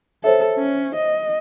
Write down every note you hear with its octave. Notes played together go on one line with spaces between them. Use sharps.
A4 C5 C#5 E5
C#4
D#5